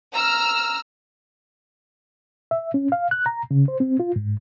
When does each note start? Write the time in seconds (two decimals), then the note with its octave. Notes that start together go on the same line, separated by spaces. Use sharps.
0.14 A#5 E6 F6
2.51 E5
2.74 C#4
2.92 F5
3.11 F#6
3.26 A#5
3.51 C#3
3.68 C5
3.80 C4
4.00 F4
4.16 G#2